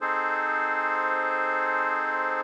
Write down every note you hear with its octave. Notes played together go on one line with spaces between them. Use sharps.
C4 D#4 G#4 A4 C5